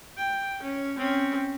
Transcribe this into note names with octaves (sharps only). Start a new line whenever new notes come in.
G5
C#4
C4 C#4